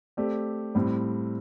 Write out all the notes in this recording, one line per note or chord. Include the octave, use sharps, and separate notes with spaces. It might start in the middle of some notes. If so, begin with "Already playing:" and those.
A3 C4 G4 D5
A2 G3 C4